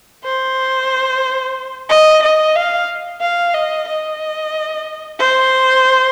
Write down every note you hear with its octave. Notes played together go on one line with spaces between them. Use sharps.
C5
D#5
D#5
F5
F5
D#5
D#5
C5